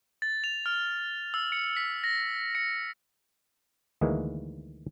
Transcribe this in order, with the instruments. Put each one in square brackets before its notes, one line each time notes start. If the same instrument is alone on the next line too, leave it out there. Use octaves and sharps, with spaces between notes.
[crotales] A6
F7
F6
E6
C#7
B6
A#6
C#7
[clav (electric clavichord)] D2 D#3 E3 G#3 A#3